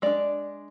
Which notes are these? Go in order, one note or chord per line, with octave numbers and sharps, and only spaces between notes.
G#3 D4 D5